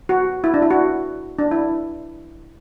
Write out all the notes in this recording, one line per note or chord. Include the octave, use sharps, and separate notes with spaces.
F#4
E4
D4
E4
F#4
D4
E4